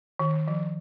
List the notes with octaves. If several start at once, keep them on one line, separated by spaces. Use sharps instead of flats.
D#3
F3